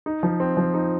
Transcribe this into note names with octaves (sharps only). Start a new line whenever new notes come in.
D#4
F3
C4
F3
D#4